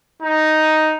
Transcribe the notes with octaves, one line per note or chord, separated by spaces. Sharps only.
D#4